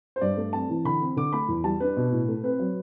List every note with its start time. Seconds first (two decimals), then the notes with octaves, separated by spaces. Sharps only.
0.16 C5
0.21 G2 D5
0.37 A3
0.53 C4 A5
0.69 E3
0.85 D3 B5
1.01 C4
1.16 D3 D6
1.33 A3 B5
1.48 E2
1.64 G3 A5
1.80 D4 B4
1.97 B2
2.12 A2
2.28 A3
2.43 C4 B4
2.59 F#3